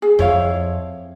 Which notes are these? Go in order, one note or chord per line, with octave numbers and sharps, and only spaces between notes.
G#4
F2 E4 C#5 F5